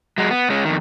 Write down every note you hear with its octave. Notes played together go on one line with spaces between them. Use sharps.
F#3 G#3
B3
G#3 C#4
F2 D#3